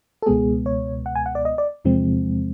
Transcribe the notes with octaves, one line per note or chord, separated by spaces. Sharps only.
A4
C#2 B2 G#3 B3 G#4
C#5
F#5
G#5
F#5
D5
D#5
D5
E2 C3 F3 G#3 C4